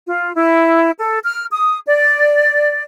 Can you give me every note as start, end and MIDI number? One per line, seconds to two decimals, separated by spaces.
0.07 0.35 65
0.35 0.90 64
0.99 1.19 69
1.24 1.45 89
1.52 1.78 87
1.86 2.82 74